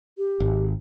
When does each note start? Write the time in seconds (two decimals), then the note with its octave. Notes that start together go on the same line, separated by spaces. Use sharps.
0.18 G4
0.40 G#1